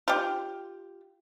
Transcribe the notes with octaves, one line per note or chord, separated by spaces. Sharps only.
F4 G4